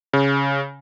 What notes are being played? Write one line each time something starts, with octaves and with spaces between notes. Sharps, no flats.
C#3